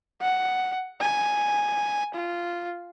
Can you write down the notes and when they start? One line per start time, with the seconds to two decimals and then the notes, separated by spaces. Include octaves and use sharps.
0.22 F#5
1.01 G#5
2.15 F4